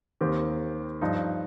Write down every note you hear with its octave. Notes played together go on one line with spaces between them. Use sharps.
D#2 D#3 C4 G4
G2 F3 D#4